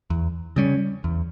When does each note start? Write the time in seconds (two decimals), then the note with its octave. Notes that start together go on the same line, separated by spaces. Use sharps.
0.10 E2
0.56 C#3 G3 C#4
1.04 E2